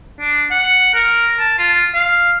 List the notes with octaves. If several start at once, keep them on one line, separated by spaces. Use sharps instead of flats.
D4
F#5
A#4
A5
F4
F5